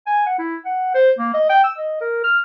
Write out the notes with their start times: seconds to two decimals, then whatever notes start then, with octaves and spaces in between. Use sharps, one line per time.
0.07 G#5
0.26 F#5
0.39 E4
0.66 F#5
0.94 C5
1.19 A#3
1.34 D#5
1.49 G5
1.64 E6
1.78 D#5
2.01 A#4
2.24 F6